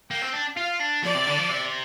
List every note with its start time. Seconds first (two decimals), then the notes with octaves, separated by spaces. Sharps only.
0.10 A#3 G5
0.22 C4
0.33 D4
0.57 F4 F5
0.79 D4
1.03 F3 D5
1.14 C3
1.27 D3
1.38 F3
1.49 C3